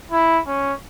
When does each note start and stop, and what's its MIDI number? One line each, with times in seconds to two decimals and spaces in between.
0.12 0.40 64
0.47 0.73 61